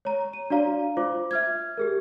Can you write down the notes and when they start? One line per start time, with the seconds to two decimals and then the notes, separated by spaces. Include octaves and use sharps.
0.05 C#5 A#5
0.33 D#7
0.50 D4 F#4 D5 F5 A#5
0.97 F4 C5 D6
1.31 E5 F6 G#6
1.77 G4 G#4 A#4